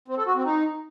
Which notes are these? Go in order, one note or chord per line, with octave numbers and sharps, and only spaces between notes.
C4
A4
F#4
C4
D#4